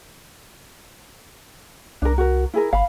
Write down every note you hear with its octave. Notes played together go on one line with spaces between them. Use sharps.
C2 D4 A#4
F#4 A#4
E4 G#4 A#4
G1 F5 B5